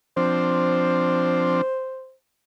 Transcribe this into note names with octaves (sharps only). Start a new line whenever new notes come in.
F3 C4 D4 C5